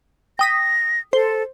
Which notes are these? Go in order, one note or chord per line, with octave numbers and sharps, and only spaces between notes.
G5 D#6 A#6 B6
A4 C5